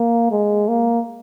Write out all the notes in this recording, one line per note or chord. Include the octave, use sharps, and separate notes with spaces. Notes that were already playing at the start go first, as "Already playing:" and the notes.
Already playing: A#3
G#3
A#3